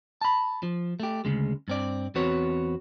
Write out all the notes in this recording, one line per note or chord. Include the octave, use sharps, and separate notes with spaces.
A5 B5
F3
A3 G4
D2 G#2 C#3 G#3
G2 C4 D5
E2 C4 F#4 B4 C#5